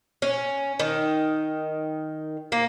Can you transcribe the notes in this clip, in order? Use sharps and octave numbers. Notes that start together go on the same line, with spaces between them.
C#4
D#3
A#3